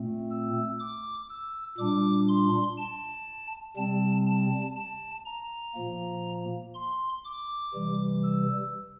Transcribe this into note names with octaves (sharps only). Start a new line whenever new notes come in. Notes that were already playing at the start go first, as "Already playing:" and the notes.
Already playing: A#2 A3 C4
E6
D6
E6
A#2 G3 D4 D6
C6
A5
C3 G3 C4 A5
A5
A5
A#5
A#2 F3 A#3
C6
D6
C3 E3 G3
E6